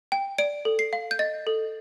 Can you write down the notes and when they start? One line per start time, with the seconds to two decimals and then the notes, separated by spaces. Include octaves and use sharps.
0.12 G5
0.38 D5 D7
0.65 A4
0.79 C7
0.93 F5
1.11 G6
1.19 D#5 A6
1.47 A4